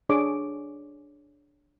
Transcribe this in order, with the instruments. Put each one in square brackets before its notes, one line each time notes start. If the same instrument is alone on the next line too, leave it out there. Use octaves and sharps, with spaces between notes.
[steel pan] D4 G#4 C#5 D6